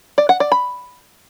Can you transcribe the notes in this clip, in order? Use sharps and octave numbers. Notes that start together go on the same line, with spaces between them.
D5
F#5
D5
B5